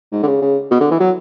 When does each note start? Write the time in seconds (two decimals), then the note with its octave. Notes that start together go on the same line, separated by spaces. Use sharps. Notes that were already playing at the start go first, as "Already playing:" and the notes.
0.12 G#2
0.23 D3
0.27 C#3
0.42 C#3
0.71 B2
0.80 D3
0.91 E3
1.00 F#3